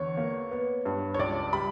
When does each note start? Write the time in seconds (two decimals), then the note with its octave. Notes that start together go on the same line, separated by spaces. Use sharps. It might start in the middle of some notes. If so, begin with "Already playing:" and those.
Already playing: E2 D3 C#5
0.17 A#3
0.51 B3
0.85 G2
1.14 C#5
1.19 C#2 D5
1.53 G3 B5